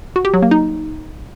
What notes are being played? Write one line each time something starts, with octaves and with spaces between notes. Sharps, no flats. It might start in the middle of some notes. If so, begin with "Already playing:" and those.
F#4
G4
F#3
A#3
D#4